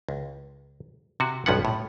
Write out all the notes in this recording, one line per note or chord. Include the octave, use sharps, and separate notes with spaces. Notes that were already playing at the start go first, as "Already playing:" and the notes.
C#2
C3 F#4
B1 G2 F3 B3 C#4 F#5
A2